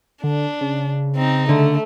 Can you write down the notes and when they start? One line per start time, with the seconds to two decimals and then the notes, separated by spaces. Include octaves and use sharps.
0.24 D3 D4
0.61 C#3
1.16 C4 D#4
1.49 D3 A3